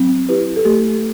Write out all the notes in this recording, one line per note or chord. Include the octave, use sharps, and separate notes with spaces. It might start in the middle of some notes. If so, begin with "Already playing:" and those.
Already playing: F#3 C4
E4 G4 B4
A4
A3 G4